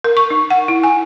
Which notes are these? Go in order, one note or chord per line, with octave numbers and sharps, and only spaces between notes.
A#4
C#6
D#4
F#5
E4
G#5